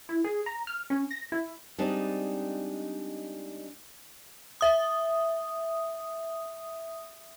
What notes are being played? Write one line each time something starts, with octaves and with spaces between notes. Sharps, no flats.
E4
G#4
A#5
F6
C#4
A#6
E4
G3 G#3 C4 D4 D#4
E5 D#6